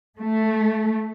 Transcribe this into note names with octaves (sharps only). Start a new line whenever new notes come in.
A3